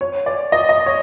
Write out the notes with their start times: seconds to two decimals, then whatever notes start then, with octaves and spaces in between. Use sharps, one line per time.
0.01 C#5
0.26 D5
0.52 D#5
0.69 D#5
0.86 C#5